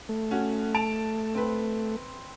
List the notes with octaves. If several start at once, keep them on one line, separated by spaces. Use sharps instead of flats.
A3
C#4 F#4
A5 D7 F7
C4 B4